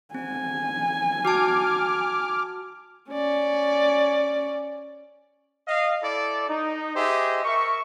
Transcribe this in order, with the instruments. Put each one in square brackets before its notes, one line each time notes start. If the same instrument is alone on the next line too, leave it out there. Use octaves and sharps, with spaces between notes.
[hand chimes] C4 [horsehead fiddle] G#5
[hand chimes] F#4 A5 [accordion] D6 F6
[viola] C#4 D5
[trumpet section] D#5 F5
E4 A4 D5
D#4
G4 G#4 C5 D#5 E5
A#4 E5 C#6